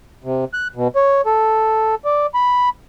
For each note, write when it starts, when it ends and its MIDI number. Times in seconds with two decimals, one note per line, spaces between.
0.24 0.45 48
0.54 0.68 90
0.76 0.88 47
0.96 1.21 73
1.26 1.95 69
2.05 2.26 74
2.34 2.69 83